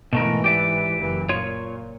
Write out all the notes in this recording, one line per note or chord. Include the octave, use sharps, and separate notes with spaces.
G#2 B2 E3 A3 A#4
G4 D5 E5
F#1 E3
A#2 F4 C#5